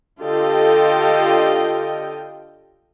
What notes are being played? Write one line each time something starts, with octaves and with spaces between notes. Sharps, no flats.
D3 F4 G4 A4 D#5 G5